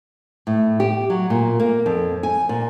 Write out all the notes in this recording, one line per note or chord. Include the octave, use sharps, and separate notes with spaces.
A2
G4
F#3
A#2
A#3
F2
G#5
A#2